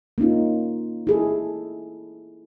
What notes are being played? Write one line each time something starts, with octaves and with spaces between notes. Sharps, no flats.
A#3 C#4 D#4 F4
E4 G#4 A4